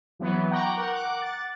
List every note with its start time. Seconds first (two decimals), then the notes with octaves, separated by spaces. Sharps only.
0.19 E3 F#3 B3
0.50 F#5 G5 A#5 C#6 D6
0.77 A#4 F#5
0.92 F#5 D6 F#6
1.22 A6